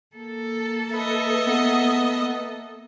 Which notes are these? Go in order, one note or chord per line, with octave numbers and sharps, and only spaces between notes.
A#3 A4
B4 D#5 E5
B3